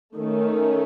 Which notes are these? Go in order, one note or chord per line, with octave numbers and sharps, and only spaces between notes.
D#3 A3 C#4